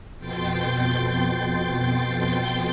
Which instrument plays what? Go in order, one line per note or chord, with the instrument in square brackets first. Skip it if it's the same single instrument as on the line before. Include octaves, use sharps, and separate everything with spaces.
[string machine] F2 B2 G5 C6 G6 A6